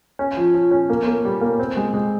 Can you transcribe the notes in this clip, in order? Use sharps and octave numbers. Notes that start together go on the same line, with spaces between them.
C#4
F3
F3
C#4
A#3
A#3
G3
A#3
C4
G#3
G#3